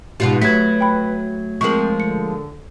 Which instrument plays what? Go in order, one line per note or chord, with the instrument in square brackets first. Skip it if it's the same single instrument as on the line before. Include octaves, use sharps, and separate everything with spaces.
[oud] G#2 B2 F4 [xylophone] G4
[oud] F#3 [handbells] A3 G#6 [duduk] B4 [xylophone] B6
[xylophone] G5 B5
[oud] F3 G#3 A#3 [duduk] C4 [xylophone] C#6 F#7
[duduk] D3 [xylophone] C#7